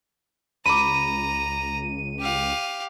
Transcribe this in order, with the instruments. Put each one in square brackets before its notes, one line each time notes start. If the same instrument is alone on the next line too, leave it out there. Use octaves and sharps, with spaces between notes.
[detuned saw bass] C#2 [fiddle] A#5 [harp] B5 D6 [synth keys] D#7
[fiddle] G4 F5